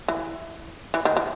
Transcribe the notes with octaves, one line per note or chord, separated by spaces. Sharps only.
E3
E3
D#3
E3